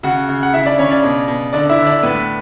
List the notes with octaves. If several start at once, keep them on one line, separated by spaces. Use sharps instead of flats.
C#3 F#4 F#5
C#3
F#5
C#3 E4 E5
D4 D5
C#3 C#4 C#5
D4 D5
B2
B2
D3 D4 D5
E4 E5
D3
D4 D5
A2 B3 B4